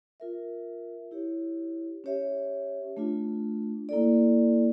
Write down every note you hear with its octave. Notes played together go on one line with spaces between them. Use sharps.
F4 A#4 E5
E4 G4 C#5
C#4 G4 C#5 E5
A3 D4 F4
A#3 E4 A4 D5